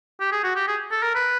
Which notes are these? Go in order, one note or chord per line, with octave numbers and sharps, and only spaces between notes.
G4
G#4
F#4
G4
G#4
A4
A#4
B4